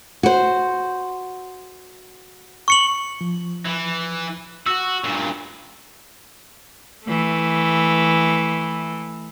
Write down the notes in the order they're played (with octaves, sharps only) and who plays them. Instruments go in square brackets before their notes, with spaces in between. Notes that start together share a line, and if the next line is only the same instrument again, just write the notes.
[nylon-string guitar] F#4 C5
[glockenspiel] C#6 C#7 F#7
[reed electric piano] F3
[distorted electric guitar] E3
[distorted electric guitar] F#4 [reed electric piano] E6
[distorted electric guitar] G2 A#2
[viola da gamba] E3 A3